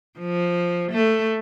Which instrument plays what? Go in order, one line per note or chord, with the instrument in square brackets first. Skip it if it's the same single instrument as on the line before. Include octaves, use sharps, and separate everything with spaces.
[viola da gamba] F3
A3